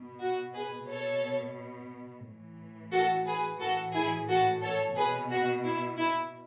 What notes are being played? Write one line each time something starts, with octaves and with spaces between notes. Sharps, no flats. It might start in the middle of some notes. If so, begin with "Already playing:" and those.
Already playing: B2
F#4
G#4 B4
B2 A4 C#5
A2 E3
F#4 A4
G#4 B4
A2 E3 F#4 A4
E4 G#4
F#4 A4
A4 C#5
B2 G#4 B4
F#4
E4
E4